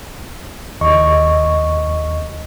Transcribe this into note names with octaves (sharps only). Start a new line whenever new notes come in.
D#2 D#5 C#6